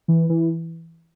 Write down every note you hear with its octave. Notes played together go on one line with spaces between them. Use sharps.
E3
E3